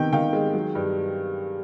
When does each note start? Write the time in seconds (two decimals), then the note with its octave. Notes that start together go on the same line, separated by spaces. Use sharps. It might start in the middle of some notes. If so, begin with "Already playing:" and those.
Already playing: C3 D#3 B3 G5
0.13 D#3 F5 G5
0.33 G#3
0.53 F#3
0.75 G2